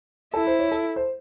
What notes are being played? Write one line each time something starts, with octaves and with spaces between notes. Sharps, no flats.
E4 A4
C5
C#5
A4
C5